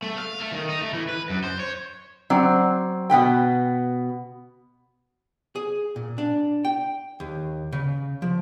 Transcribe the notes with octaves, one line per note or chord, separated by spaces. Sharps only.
A3
F5
A3
D#3
D#4
A3
E3
B4
F#2
C5
C#5
F#3 C4 D5
B2 B3 B4 G5
G#4
A#2
D4
G5
D#2
C#3
F3